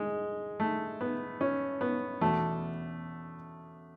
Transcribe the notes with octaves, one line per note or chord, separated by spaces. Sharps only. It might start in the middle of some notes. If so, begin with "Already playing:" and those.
Already playing: G#3
A3
B3
C#4
B3
E2 B2 A3